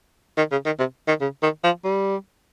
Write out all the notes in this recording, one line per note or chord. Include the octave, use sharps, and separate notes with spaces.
D#3
C#3
D#3
C3
D#3
C#3
D#3
F3
G3